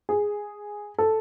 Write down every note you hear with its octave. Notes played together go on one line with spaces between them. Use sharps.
G#4
A4